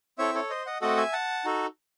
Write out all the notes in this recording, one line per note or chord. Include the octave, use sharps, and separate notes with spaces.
C4 E4 A4 C#5 E5
A4 C#5
C5 D#5
D#5 F#5
A3 C4 F#4 A4 D#5 F#5
E5 G#5
F#5 A5
D#4 F#4 A4